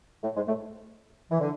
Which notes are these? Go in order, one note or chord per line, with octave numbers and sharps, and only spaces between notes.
A2 A3
G#2 G#3
A2 A3
E3
D3